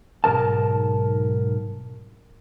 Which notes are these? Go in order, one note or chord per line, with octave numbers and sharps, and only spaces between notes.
B1 G#2 C3 A#4 A5